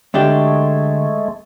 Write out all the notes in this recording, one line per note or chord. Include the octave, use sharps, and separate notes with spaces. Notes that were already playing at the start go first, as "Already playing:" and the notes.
D2 G#3 A3 D4 G4